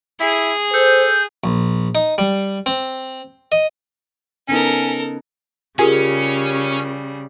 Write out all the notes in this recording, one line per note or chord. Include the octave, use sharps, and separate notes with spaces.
E4 G#4
A4 C5 G6
A#1
D#4
G3
C4
D#5
C#3 B3 C#4 D#4 A4 A#4
C#3 G3 C#4 F4 G4 G#4 A#4